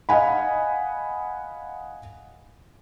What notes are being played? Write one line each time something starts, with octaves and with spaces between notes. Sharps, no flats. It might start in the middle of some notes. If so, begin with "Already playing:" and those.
D#5 F5 F#5 G#5 B5